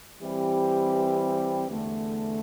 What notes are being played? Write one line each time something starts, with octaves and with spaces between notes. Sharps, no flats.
E3 G3 C4 G4
E2 D3 A3